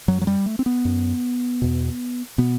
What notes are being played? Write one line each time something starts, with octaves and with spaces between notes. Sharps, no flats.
F#2 F#3
F#3
G3
A3
C4
B3
F#2
E2 B2
B2 B3